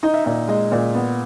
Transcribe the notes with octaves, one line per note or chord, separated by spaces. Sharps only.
D#4 D#5
E5
A#2 D#5
G#3 D#5
A#2
B3